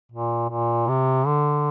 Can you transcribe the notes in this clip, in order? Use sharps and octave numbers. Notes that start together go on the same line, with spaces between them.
A#2
A#2
C3
D3